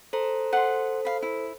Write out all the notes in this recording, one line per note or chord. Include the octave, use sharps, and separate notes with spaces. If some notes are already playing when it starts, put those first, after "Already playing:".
A4 C5 A#5
A4 C5 F#5 C6
F5 B5
E4